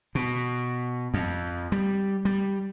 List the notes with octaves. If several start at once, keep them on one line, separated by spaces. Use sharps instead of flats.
B2
F2
G3
G3